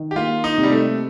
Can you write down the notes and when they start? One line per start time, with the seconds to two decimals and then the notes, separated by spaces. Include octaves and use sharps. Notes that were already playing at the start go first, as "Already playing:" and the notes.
Already playing: D#3
0.11 G4
0.16 A#3 F4
0.44 D#4
0.58 C3
0.63 G3
0.72 A3